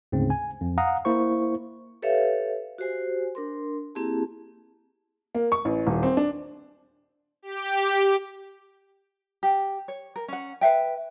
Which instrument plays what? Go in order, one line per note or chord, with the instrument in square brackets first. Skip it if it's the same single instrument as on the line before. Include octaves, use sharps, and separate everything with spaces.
[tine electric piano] D2 G#2 C#3 C4
G#5
F2
F5 F#5 A#5 D#6
A#3 E4 C5 C#6
[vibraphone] G4 A4 B4 C#5 E5 F5
F#4 G4 C5 G#5
D4 A#4 C6
A#3 C4 E4 G4 G#4 A5
[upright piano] A#3
C#6
A1
D#1
C4
D4
[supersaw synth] G4
[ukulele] G4
C#5
A#4
C#4 F#5
B4 E5 G5